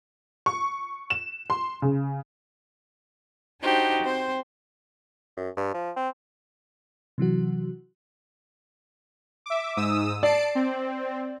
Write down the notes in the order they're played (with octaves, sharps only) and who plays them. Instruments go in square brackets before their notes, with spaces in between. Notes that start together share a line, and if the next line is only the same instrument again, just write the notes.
[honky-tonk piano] C#6
E7
C6
C#3
[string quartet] D4 D#4 F#4 G4 C5
C4 C5
[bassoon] F#2
G2
F3
C4
[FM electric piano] C3 E3 F#3 F#4
[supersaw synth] E5 D6
G#2 D#6 E6
[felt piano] D5 [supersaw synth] A5 C7 D7
[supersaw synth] C4